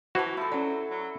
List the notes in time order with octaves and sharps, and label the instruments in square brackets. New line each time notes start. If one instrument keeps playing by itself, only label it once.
[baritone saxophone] E3 [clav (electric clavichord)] F#4 [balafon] C5 A5
[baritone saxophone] F3 [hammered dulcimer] E4 A4
[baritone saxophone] F#3 [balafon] C#4 D5
[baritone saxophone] F#3